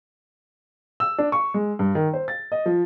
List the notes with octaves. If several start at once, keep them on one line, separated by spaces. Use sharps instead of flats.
E6
D4
C#6
G#3
G2
D#3
C5
A6
D#5
F3